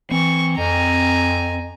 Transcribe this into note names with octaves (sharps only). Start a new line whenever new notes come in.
E3 C4 C#6
F2 G#5 A#5